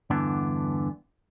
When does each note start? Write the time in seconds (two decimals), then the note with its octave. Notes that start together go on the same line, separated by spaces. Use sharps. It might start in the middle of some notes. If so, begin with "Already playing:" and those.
0.10 E2 G2 D3 E3 B3 D4